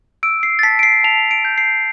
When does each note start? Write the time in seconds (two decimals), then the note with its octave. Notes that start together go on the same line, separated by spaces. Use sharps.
0.23 E6 D7
0.43 C7
0.59 A6
0.63 A5 B6
0.79 D7
0.83 C7
1.04 A5 F7
1.31 D7
1.45 G6
1.58 C7